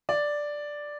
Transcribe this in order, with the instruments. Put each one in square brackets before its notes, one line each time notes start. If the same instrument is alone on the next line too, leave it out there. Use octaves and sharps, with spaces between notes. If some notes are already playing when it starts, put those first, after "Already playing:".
[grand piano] D5